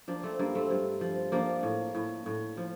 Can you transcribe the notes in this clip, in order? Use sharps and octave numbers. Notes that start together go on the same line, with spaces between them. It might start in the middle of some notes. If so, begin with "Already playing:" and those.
F3 A#3 D4
A3 C4
G2 A#3
A3 C4
G2
F3
F3 A#3 D4
A2
A2
A2
F3